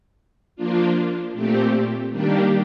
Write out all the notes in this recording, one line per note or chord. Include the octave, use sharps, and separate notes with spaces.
F3 A#3 D4 F4
A#2 A3 C4 G4
D#3 G3 A#3 D4 G4